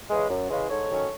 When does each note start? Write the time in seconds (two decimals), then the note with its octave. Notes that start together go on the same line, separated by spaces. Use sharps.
0.09 C#3 E3 G#3
0.29 F#2
0.50 C#3 E3 G#3
0.70 G#2 A4 C#5
0.90 D#3 F#3 C#4